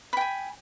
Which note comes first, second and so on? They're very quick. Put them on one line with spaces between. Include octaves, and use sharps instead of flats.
B5 G5 G#5